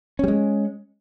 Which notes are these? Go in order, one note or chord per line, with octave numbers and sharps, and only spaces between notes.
G3 G#3 C#4